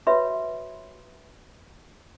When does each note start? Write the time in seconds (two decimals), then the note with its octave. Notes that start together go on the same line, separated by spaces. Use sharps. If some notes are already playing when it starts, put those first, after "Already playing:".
0.07 F#4 B4 C#5 E5 B5 C6